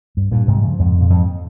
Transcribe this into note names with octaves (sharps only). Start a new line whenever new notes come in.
G2
G2 A#2
G#2 C3
G3
C#3 F3
F2 G#2
A#2
F2 G#2